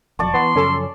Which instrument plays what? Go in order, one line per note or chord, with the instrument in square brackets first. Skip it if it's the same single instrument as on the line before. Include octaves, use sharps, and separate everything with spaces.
[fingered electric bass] E1 F2 F#3 [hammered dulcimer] D5 A5 C#6
[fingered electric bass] E3 [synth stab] B3 [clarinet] C6
[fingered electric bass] F#2 C#3 F3 [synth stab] C#4 A4